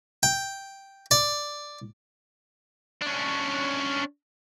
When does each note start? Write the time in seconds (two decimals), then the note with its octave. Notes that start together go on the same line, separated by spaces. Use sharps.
0.23 G5
1.11 D5
3.02 C#4 D4